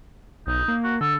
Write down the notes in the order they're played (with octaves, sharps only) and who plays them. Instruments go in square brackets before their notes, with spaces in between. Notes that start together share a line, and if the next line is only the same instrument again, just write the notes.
[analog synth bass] B1 [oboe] D#4
[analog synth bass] A#3
[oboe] F#4
[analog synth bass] D3 [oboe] A4